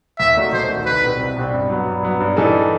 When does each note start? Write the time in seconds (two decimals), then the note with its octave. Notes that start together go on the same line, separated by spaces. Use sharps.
0.19 D#2 E5
0.36 D#3 A3 D#4 F#4
0.53 D#2 C5
0.69 D#3 A3 D#4 F#4
0.86 C2 B4
1.03 B2 G3 C4
1.19 C2
1.36 B2 G3 C4
1.53 G2
1.70 F#3 B3
1.87 G2
2.03 F#3 B3
2.20 G2
2.37 E3 G3 D#4 A4